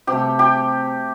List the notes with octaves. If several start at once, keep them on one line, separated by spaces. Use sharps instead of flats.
C3 A3 G4
G4